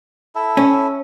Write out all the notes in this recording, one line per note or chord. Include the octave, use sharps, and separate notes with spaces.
E4 A4 E5
C#4